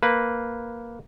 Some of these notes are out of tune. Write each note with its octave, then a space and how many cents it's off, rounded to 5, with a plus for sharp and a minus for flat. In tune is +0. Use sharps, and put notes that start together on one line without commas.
A#3 +0 B4 +0